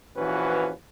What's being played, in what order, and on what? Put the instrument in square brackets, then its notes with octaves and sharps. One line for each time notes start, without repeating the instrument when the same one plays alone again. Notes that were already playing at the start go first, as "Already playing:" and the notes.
[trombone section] A#1 E3 F3 C#4 F#4 B4